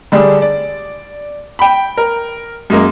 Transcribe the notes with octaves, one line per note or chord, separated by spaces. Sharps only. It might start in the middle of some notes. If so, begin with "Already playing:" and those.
D3 G3 D4 G#4
D5
G5 B5
A#4
F#2 G#3 A#3